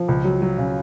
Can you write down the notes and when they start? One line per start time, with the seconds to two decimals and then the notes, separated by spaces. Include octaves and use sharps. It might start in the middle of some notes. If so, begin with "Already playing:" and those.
Already playing: F3
0.08 C#2
0.24 F#3
0.42 F#3
0.58 C#3